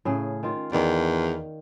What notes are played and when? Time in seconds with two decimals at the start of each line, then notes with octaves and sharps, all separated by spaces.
0.05 A2 C#3 G#4
0.43 D#3 F4
0.72 E2 D#3 D5